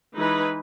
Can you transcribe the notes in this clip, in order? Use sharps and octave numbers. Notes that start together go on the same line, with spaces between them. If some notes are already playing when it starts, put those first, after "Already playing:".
E3 G#3 D#4 B4